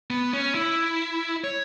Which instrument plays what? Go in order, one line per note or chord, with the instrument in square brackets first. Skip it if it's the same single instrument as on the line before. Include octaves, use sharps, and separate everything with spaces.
[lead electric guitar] B3
C#4
E4
C#5